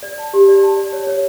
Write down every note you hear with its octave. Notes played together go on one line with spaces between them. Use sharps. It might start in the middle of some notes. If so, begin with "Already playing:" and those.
D5
A5
G4
D5
A5
D5
C#5
C#5